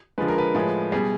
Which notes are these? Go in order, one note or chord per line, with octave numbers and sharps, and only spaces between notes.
D3 F3 G#3 B4
A#4
B4
A2 F3 G#3
B2 G3 G#4